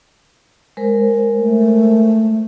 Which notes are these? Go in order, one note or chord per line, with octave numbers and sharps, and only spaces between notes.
G#3 A#4 C5
A3